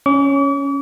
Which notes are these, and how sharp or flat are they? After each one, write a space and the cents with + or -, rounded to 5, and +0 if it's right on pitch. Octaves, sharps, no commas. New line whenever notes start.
C#4 +0 D6 -45